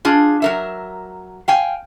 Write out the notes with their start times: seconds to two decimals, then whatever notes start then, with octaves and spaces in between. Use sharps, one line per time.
0.05 D4 F4 G#4
0.42 F#3 A#4 E5
1.48 F5 G5 G#5